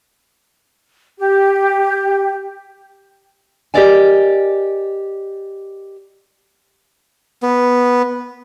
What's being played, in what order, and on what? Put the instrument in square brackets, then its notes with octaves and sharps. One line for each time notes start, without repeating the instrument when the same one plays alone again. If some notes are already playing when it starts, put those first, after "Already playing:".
[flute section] G4
[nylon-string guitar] G4 A4 A#4 D5 D#5 G#5
[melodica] B3